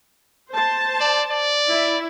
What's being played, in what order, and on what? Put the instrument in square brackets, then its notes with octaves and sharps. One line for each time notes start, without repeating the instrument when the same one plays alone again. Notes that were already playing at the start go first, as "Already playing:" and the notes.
[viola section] C5 A5
[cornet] D5
D5
[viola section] E4